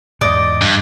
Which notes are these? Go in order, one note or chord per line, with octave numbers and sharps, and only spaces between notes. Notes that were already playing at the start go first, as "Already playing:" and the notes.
E2 G#2 D5 D#5
G2